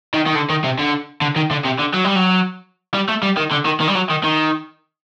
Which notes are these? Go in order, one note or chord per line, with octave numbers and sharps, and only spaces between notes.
D#3
D#3
D3
D#3
C3
D3
D3
D#3
D3
C3
D3
F#3
G3
F#3
G3
A3
G3
D#3
D3
D#3
D#3
G3
F#3
D#3
D#3